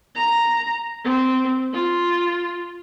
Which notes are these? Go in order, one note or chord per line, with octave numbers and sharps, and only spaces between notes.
A#5
C4
F4